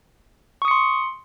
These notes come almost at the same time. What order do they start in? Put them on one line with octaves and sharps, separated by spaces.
C#6 D#6 C#7 C6